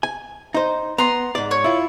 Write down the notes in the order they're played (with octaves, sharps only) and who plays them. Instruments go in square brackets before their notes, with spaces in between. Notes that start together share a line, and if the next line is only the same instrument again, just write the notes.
[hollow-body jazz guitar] G#5
D#4 C5
[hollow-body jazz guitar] B3 [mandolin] A#5 C6
[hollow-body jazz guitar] G#2 D5
[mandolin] C#5
[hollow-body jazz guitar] E4 F4